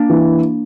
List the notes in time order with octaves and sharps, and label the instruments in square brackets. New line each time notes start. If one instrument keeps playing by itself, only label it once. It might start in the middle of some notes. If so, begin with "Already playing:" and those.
Already playing: [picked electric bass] A#3 D4
[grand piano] E3